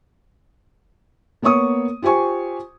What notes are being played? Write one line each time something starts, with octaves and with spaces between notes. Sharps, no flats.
A#3 B3 C#5 C#6 D#6
F4 G4 C5 G#5 C#6